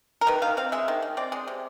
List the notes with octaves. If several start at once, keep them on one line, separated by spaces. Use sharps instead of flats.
A#4
D#3 B4
D#3 F5
C4 F5
G#3 E5
D#3
D#3
C4 D5
G#3
C3